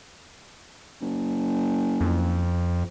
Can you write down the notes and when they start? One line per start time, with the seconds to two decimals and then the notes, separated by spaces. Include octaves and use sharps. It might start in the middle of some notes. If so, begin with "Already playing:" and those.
1.01 F#1
2.01 F2